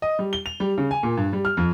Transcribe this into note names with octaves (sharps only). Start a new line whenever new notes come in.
D#5
G3
G7
F7
G3
C#3
G#5
A#2
G2
G3
F6
F2